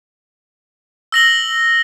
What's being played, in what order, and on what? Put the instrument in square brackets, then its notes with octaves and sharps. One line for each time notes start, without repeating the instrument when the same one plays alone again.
[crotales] E6 A#6 F#7 G7